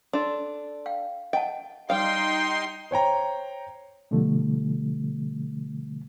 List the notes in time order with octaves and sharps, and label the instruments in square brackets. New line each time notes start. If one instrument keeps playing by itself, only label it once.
[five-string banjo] D4 A4 [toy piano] C6
[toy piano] F5 G5
[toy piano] D#5 F#5 A5 [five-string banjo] G5
[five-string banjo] G3 F5 [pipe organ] D#4 C6 [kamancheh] G5 [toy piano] D#6
[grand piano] C5 C#5 G5 A#5
[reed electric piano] B2 D3 F3 G3 A3